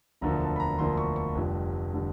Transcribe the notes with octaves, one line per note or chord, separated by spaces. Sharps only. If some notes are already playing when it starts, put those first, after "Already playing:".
E1 D2 D3 F3 A#3 A#5
A5
B5
A#5
E1 D2 D3 F3 A#3 C6
C#6
C#6
F1 F2 D3 G3
D3 G3